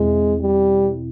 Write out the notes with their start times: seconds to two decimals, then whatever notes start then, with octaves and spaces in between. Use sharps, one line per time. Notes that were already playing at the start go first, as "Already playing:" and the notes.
Already playing: E2 B2 G#3 C4 E4
0.41 G3